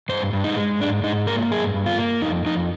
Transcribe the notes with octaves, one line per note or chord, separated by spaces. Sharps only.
G2 C5
G2
D#4
G#3
G#2 D4
G#2 D#4
A#3 A#4
G2 G#4
G2
F4
A#3
F2 D#4
F2 D#4